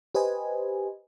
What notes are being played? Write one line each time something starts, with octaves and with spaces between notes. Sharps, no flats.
G4 B4 C5 D#5 G#5